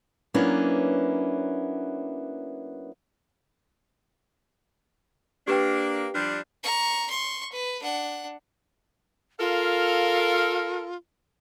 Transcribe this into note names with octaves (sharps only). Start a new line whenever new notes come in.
F#3 A#3 B3 C#4 D4 E4
A#3 D4 G4 B4 G5
F3 G3 D4
A#5 C#6
C6 C#6
B4
D4 F#5
F4 A4 A#4 F5